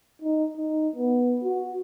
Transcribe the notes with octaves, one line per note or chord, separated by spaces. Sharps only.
D#4
D#4
B3
F#4